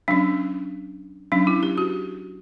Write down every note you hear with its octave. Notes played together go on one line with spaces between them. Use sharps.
F#3 C#4 D4
F#3 C#4 D4
E4
G4
F#4